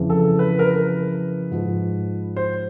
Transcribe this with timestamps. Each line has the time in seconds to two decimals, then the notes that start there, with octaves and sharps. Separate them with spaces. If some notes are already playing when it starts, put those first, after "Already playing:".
Already playing: F2 C#3 E3
0.10 A4
0.39 B4
0.59 A#4
0.66 B4
1.51 G#2 F3
2.36 C5